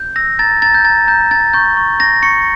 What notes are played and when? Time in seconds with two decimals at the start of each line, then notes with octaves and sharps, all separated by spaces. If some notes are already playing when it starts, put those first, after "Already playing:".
Already playing: G6
0.16 E6 A#6
0.39 A#5 A6
0.62 A#5 A6
0.74 G6
0.85 A#5 A6
1.08 A#5 G6
1.31 G6 A6
1.53 C#6 G6
1.77 C#6
2.00 G6 A#6
2.22 C#6 C#7